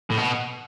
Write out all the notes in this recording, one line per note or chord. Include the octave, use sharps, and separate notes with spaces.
A2
B2